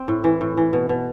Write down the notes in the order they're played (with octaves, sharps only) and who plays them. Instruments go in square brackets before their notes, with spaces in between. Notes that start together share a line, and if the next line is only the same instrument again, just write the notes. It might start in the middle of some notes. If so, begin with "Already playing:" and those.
Already playing: [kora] C4
A2
E3
A2
E3
B2
B2